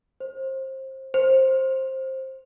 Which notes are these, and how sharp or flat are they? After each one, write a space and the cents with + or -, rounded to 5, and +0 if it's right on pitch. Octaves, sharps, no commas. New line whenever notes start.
C5 +25
C5 +15